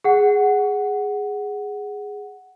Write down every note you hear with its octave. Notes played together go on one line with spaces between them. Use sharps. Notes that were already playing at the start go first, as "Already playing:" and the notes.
G#4 F#5